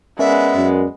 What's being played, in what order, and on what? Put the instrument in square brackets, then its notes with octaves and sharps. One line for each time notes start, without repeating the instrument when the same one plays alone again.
[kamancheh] G#3 B3 [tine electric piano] C#4 A#4 D5 [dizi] E5
[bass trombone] F#2